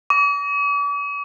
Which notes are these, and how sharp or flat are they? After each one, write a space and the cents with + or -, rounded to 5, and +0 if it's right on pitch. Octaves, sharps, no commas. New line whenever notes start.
D6 -45